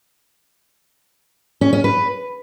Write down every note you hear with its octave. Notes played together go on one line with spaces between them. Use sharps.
C#4
C#4
B4